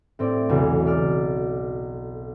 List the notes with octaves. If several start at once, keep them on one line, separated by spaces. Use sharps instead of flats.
A2 C4 D5
B1 E2 C#3
D5 F6